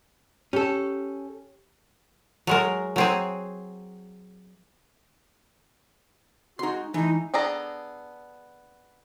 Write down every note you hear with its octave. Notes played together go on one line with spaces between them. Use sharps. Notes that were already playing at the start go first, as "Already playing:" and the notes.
C#4 G4 A4 C#5
F#3 G#3 A#4
F#3 C4 G#4
G#3 D#4 F#4 C6
E3 G#3 A3 D#4
B3 D4 G#4 A4 A#5